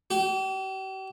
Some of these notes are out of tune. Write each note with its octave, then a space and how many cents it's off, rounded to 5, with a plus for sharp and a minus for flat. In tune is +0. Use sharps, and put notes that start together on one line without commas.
G4 -40